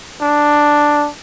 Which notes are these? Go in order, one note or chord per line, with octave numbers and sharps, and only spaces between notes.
D4